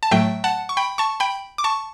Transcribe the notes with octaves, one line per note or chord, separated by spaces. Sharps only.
A5
A2 F#3 A3 E5 G5
F#5 A5
C#6
G5 B5
A5 C#6
G5 B5
D6
A5 C#6